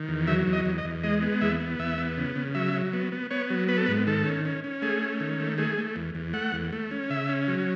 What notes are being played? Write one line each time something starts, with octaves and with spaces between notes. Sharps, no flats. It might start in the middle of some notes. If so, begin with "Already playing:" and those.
Already playing: D#3
E2
F#3 E5
E2
D#5
E2
D#5
E2
G#3 D#5
B3
E2 E5
B3
E2 E5
B3
C#3
C#3
F#3 E5
F#3
B3
B3
B3 C#5
F#3
B3 B4
A4
G#2 B4
D#3 A4
C#4
C#4
C#4
A3 G#4
C#4
D#3
A3
A3 G#4
A3
E2
E2
A3 F#5
E2
A3
C#4
C#3 E5
C#4
F#3